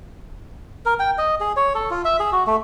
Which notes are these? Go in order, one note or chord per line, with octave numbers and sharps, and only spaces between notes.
A#4
G5
D#5
G#4
C#5
A4
F4
E5
G#4
F#4
A3